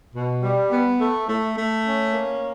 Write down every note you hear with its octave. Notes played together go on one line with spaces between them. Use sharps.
B2
G3
B3
A3
A3
A3
C#4
A#3